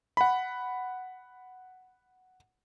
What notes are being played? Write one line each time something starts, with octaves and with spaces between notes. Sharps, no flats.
F#5 B5